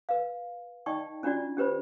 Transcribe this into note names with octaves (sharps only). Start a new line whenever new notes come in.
B4 F5
D#4 D5 D#5 G5 A5 C#6
C#4 D4 F4 F#4 D5
C#4 G4 B4 C5 B5